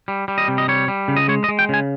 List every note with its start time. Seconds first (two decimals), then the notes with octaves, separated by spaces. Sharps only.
0.08 G3
0.28 G3
0.38 D#5
0.48 C3
0.58 D#5
0.68 G3 C#5
0.88 G3
1.08 C#3
1.17 D#5
1.28 G#3 C#5
1.44 D#5
1.49 G#3
1.59 G5
1.69 C#3 G#5